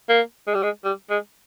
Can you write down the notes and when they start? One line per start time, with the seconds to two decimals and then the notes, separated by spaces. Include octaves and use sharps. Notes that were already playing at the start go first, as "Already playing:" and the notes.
0.09 A#3
0.47 G#3
0.54 G3
0.63 G#3
0.84 G3
1.10 G#3